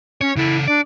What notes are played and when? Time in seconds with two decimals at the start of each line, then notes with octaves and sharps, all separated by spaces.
0.21 C#4 C#5
0.36 C#3 E4 A4
0.67 D4 D5